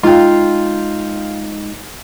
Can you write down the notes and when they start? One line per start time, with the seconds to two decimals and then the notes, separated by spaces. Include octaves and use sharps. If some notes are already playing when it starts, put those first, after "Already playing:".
0.03 G#3 D#4 F4 F5 G5